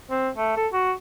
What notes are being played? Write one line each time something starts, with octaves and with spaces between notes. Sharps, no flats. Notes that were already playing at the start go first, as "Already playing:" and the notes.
C4
A3
A4
F#4